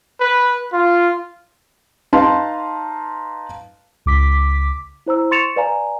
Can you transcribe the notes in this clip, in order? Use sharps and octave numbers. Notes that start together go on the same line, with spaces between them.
B4
F4
D#4 B4 F5 A5 C6
C#2 D6 B6
E4 C5 A#5 E6
C6 C#6 A6 C#7 E7 F7
B4 D5 F5 G#5 A#5